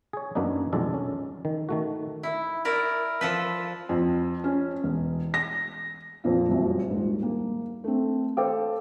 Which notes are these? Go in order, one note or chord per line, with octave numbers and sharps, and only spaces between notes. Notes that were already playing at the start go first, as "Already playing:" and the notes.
G#4 C#5
F#2 A#3 B3 D4 D#4
B1 F2 G#3 D4 A4 A5
C#4
D#3
D#3 A3 F#4
E4
E4 A#4 D5
F3 A4 B4
F2
C#4
E1
A#6
F2 A#2 F4
F#1 C2 F#2
D#1 G#2
A#3
A3 C4
A4 C5 F5 G5 D6